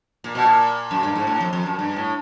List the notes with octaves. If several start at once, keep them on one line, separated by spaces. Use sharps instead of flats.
A#2
B2
A#2
F#2
G2
G#2
A2
F2
F2
F#2
G2
A2